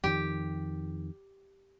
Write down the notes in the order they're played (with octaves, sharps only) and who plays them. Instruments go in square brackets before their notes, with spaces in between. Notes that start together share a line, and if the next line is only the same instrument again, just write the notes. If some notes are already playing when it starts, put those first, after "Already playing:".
[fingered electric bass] F2 D#3 [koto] G4